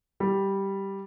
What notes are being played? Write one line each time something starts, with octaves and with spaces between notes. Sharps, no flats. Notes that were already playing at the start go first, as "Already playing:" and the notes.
G3